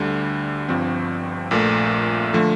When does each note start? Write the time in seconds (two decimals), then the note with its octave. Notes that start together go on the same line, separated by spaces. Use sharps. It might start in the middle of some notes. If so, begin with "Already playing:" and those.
Already playing: D2 D3 G3
0.69 G1 G2 F3 C4
1.51 A#1 A#2 A3
2.33 D3 F3 A3